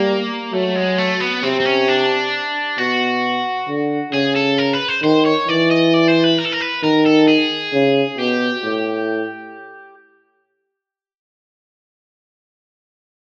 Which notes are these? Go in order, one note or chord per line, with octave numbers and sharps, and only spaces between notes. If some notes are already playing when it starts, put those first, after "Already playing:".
Already playing: G3 A#3
F#3 A3
G#3
A3
B3
C3 C4
C4
C#4
D4
B2 F#4
D3
C#3 G#4
A4
A#4
B4
C5
D#3 C5
C#5
E3 D5
D#5
D5
C5
B4
A#4
A4
A#4
B4
D#3 A#4
A4
G#4
C#3
B2 G4
A2